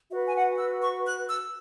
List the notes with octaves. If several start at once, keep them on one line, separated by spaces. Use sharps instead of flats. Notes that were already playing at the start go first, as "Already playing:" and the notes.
F#4 B4 E5
G#5
F#5
E6
C#6
F#6
E6